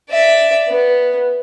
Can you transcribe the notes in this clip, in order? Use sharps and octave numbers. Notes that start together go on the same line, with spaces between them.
D5 E5
B3